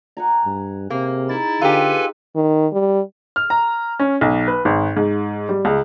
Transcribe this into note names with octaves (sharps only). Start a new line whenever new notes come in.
F#5 G#5 A#5
G2
C3 A#3 G#4
D#4 E4 A6
D3 F4 G4 A4 B4 G#5
D#3
G3
F6
A#5
C#4
B1
B4
G#1
G#2
G3
C#2